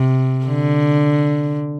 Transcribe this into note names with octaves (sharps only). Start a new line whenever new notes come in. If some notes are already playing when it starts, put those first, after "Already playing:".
Already playing: C3
D3